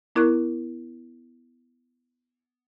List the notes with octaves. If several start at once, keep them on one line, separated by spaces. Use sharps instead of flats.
B3 E4 A#4 C#6 F#6